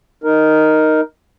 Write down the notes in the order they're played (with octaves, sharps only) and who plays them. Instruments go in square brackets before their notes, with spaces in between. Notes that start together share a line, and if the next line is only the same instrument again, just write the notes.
[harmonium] D#4 A#4